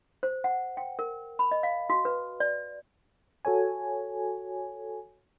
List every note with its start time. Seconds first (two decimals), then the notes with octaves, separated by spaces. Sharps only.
0.23 C5
0.44 F#5
0.77 G5
0.99 A#4
1.39 B5
1.51 D#5
1.63 F5
1.90 F#4
2.05 B4
2.40 D5
3.45 F#4 A4 C#5 G#5